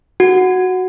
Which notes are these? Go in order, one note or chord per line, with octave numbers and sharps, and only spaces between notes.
F#4